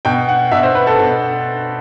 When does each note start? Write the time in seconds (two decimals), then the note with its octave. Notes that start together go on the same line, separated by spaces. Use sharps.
0.05 B2 G5
0.29 F#5
0.51 B2 E5
0.63 C5
0.75 B4
0.87 A4
0.99 B2